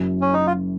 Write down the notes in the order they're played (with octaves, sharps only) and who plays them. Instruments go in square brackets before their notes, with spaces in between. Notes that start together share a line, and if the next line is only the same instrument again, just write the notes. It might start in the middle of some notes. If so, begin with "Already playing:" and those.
Already playing: [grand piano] F#1 F#2 C#3
[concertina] C#4
D#4
F4